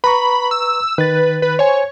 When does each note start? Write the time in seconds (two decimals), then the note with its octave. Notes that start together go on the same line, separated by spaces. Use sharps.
0.04 B4 A#5 B5 C#6
0.51 E6
0.98 D#3 B4 A6
1.42 B4
1.59 C5 C#5 G#5